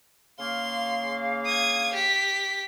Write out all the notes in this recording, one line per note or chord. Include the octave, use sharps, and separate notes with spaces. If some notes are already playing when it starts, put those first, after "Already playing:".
C#3 A#3 F5 C6
D#6 G#6
G4 B6